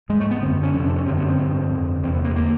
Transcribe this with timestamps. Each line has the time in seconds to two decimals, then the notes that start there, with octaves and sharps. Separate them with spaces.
0.09 G#2 G#3
0.20 A3
0.31 B3
0.42 F#2 D3 C4
0.63 C#4
0.74 F2 C3 C#4
0.85 D4
0.96 C#4
1.06 F#2 D3 C4
1.17 B3
1.28 C4
1.38 G2 D3
1.71 F2 D3
2.03 E2 C3 C4
2.15 B3
2.25 A#3
2.36 D3 A#3